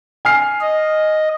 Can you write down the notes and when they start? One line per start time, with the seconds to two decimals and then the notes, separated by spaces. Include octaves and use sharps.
0.25 G#5 F6 C7
0.61 D#5